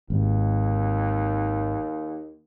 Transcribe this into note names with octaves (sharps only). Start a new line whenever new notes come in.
G#1 D#2